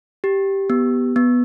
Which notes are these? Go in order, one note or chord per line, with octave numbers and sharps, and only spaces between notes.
G4
B3
B3